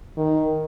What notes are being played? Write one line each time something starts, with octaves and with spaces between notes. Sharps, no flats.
D#3